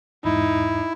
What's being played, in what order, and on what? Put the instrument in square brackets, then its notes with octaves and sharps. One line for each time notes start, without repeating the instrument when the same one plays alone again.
[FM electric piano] E2 G#2 [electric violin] D#4 [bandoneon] E4